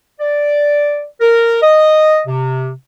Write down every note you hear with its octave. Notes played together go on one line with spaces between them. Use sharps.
D5
A#4
D#5
C3